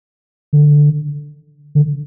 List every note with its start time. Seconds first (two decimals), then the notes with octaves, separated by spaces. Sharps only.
0.53 D3
1.75 D3